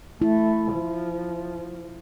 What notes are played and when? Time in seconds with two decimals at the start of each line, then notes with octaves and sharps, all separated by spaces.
0.22 A3 E4
0.74 F3